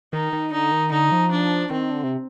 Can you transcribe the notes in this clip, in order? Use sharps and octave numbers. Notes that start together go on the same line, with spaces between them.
D#3 D#4
D#3
D3 D#4
D#3
D3 D#4
F3
D4
D#3 C4
D3
C3